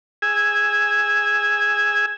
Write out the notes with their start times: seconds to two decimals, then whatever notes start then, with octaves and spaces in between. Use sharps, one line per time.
0.22 G#4 G#5 E6